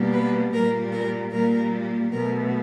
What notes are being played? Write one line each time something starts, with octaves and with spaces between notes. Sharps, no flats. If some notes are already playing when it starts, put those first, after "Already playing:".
Already playing: B2 G3 A#3
B4
A#2 G3 A#3 A#4
A#4
A#2 G3 A#3 A#4
B2 F#3 A3 A#4